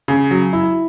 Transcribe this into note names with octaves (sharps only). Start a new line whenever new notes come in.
C#3
F#3
E4